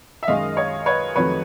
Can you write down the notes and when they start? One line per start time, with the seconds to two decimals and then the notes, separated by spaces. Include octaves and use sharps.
0.23 E5
0.27 F#2 D#3 G#3 D#5 F5
0.57 C#5 D#5
0.86 B4 C#5
1.15 F2 C3 D#3 F#3 A3 B4 C#5